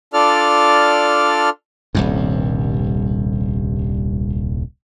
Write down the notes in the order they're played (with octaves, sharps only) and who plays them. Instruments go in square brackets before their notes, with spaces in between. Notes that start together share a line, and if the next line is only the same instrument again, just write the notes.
[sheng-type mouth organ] D4 F4 A4 D5 F6
[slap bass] D#1 C2 G2